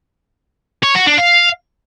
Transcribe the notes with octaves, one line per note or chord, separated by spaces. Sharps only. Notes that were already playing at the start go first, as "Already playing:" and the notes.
C#5
F#4
D4
F5